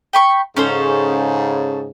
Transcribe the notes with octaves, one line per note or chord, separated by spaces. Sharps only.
G5 B5 C#6
G#2 C#3 C#4 A4 C5